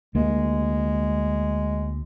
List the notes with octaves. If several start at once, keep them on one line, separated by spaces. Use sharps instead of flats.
D2 G#3 A#3